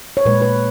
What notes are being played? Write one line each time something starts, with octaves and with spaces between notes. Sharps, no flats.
C#5
A#2 G#3 B4
B4